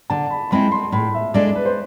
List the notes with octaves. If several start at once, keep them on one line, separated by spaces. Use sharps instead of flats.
D3 A5
B5
G#3 C4 E4 B5
C6
A2 B5
E5
G#3 D4 A4 D5
B4
C5